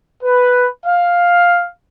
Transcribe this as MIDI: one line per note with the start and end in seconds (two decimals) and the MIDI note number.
0.23 0.63 71
0.86 1.67 77